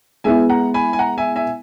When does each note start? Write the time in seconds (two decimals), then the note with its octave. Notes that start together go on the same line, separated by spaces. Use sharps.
0.24 G#3 B3 E4 E5 G#5
0.49 F#5 A#5
0.74 G#5 B5
0.93 G#5
0.99 F#5 A#5
1.18 E5 G#5
1.36 E5 G#5